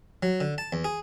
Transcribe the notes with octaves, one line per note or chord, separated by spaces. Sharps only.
F#3
D3
A5
E2
G#4